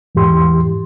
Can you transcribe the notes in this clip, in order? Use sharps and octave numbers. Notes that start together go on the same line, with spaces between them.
E2 G#2 E3 G4 C6